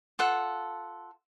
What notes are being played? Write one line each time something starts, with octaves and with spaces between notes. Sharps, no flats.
F4 A4 F#5